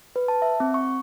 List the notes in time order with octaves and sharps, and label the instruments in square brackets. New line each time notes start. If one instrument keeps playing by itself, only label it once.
[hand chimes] B4
A5
E5
C4
C#6